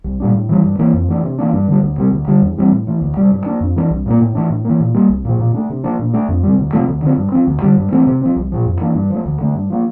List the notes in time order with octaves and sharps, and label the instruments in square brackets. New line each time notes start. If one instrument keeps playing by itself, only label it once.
[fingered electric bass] C2
A#2 G3 D4
A2
E3 G3
G2
E3 A#3
F2
E3 A3 D4
C3
E3 A#3 D4
G2
D3 G3
D2
C3 G3
D2
D3 G3
E2
E3 G3 C4
A2
E3 A3
D2
C3 G3
G2
F3 A#3 D4
F2
E3 A#3 D4
C2
A#2 G3 A#3
A2
E3 A3 D4
A2
E3 A#3
A#2
G3 A#3
C2
A#2 F3
A#2
A3 D4
C3
F3 A#3 D4
A#2
A3 D4
F2
C3 G3
D2
C3 F3 A3
D2
D3 F3 C4
G2
F3 C4
D2
D3 G3
G2
E3 A3 C4
C3
F3 C4
C2
A#2 F3
F2
E3 A#3 D4
G2
F3 A3
D2
D3 A3
G2
F3 A#3